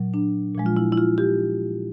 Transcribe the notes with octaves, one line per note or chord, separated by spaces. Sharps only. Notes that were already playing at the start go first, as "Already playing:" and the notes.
Already playing: A#2 F#3
D4
A#2 F3 G#3
F4
E4
E4
F4
G4